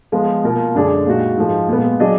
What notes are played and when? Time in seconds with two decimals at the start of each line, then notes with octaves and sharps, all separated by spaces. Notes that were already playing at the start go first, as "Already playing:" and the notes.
0.12 F3 G#3 B3 F4
0.44 B2 A#3 F4 A#4
0.75 F#2 D3 G#3 D4 G#4
1.06 A#2 G#3 D#4 F#4
1.37 G#2 F3 G#3
1.69 A#2 G#3 B3
2.00 F#3 D4 G#4 D#5